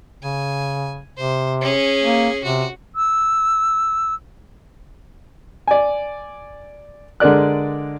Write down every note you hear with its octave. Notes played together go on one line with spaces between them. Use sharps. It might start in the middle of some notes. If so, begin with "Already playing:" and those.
C#3 G#5
C3 C5
C#4 G#4
A#3
C3 F#4
E6
D5 G#5
D3 G#3 A#4 D5 F#6